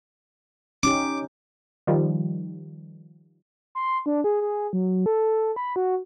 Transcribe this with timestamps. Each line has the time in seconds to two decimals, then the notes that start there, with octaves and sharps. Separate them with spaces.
0.83 C#4 D#4 G4 D6
1.87 D#3 F3 G3
3.75 C6
4.06 D4
4.24 G#4
4.41 G#4
4.73 F#3
5.06 A4
5.56 B5
5.76 F#4